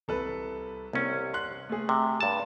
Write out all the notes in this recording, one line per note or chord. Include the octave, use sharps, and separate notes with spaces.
C2 A4 B4
C2 C3 C#4
C6 F#6
A3 G#4
C3
G2 A5